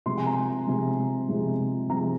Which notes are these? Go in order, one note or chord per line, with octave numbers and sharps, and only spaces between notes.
C3 F3 G#3 C6
G#5
A#5
C3 F3 G#3
C3 F3 G#3
C3 F3 G#3 A#5